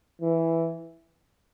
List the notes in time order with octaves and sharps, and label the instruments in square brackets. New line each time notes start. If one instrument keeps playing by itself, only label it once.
[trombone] E3